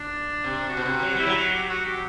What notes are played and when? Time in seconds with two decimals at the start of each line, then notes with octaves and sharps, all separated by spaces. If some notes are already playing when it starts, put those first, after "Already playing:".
Already playing: D4
0.44 C3
0.69 F#4
0.77 B2
0.86 C3
1.02 F#3
1.15 G3 E4
1.26 F#3
1.36 F#4
1.53 G4
1.69 F#4
1.86 G4